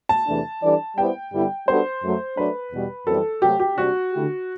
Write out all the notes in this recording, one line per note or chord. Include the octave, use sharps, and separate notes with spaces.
A5
E2 C3 E3 A3 D4
E3 G3 D4 A4 D5
G3 B3 E4 G4 C5 G5
G2 D3 G3 B3 E4
G3 B3 D4 F#4 A4 C5
F#2 F#3 A3
F#3 A3 D4 B4
E2 B2 G3
F#2 E3 G3 C4 A4
C3 F#3 A3 C4 G4
G4
C3 G3 D4 F#4
D3 A3 E4 G4